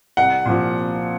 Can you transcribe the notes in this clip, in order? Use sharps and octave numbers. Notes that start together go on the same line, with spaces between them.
C2 F#5
A#2 F3